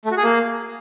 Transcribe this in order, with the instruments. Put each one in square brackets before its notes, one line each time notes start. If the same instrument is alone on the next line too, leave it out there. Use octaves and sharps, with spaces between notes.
[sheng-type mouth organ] A3
F#4
G#4
A#3